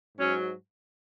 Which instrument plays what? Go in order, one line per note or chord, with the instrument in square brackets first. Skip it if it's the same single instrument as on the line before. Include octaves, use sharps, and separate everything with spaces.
[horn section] G#2 F#3 C#4